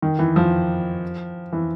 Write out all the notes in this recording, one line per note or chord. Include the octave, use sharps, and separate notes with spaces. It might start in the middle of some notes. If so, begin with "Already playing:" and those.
D#3
E3
F3
E3